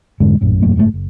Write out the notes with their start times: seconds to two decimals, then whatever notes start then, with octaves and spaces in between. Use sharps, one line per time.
0.20 F2 G#2 D3 G#3
0.41 A#1 F#2 A2
0.62 E1 F#2 A2 A#3
0.76 F#1 G#2 C#3 A3
0.94 F#1